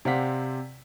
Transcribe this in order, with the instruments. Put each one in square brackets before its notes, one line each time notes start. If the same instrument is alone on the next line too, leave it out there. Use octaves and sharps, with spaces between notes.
[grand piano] C3 C4 D5 F5 F#5 B6